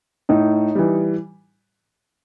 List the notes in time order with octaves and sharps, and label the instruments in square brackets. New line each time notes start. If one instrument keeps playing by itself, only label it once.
[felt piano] A2 [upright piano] D#4
[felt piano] E3 G3